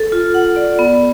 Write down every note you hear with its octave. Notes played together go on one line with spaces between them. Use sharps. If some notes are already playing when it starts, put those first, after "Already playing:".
Already playing: A4
F4
F#5
D5
B3